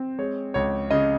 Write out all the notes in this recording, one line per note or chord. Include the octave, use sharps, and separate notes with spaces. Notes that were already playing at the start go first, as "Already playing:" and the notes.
Already playing: C4
G#3 C#5
C#2 C#5
C#3 D#5